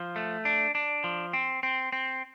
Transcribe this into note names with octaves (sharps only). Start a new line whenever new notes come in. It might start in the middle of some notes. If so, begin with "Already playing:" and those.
Already playing: F3
A3
D4
D4
F3
C4
C4
C4